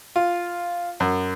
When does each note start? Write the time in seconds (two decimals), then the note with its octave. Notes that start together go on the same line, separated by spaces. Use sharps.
0.16 F4
1.00 F#2